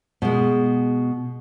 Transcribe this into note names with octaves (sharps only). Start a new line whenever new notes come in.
B2 G#3